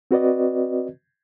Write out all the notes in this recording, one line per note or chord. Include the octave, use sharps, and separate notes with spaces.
C4 F#4 B4 D5 D#5